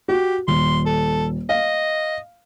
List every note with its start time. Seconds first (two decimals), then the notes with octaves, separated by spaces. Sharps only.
0.08 F#4 G4
0.48 D#1 C6
0.86 A4
1.49 D#5 F5